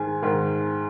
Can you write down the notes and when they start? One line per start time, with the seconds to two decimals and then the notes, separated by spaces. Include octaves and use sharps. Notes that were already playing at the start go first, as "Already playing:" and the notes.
Already playing: G#2 D#3 G#3 G#5
0.22 G#2 D#3 G#3